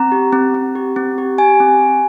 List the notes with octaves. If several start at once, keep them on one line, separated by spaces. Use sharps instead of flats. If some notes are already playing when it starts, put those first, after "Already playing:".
Already playing: C4 A#5
G4
C4
C4
G4
C4
G4
G4 G#5
C4
G4